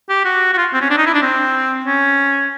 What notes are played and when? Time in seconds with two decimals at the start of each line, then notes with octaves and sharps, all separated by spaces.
0.09 G4
0.25 F#4
0.53 F#4
0.57 F4
0.74 C4
0.81 C#4
0.90 D4
0.97 D#4
1.06 E4
1.14 D4
1.22 C4
1.86 C#4